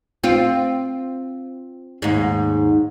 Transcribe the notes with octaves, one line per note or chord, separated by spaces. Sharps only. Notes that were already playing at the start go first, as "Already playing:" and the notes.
C4 F4
D#2 G#2